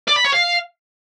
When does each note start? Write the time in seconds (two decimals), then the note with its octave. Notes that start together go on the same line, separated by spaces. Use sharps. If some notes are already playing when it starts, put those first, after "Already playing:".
0.08 D5
0.16 B5
0.25 C#5
0.33 F5